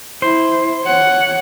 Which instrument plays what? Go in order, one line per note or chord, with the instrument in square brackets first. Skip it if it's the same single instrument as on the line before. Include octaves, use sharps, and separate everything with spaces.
[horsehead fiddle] E4 [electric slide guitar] C5
[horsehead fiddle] C#5 F#5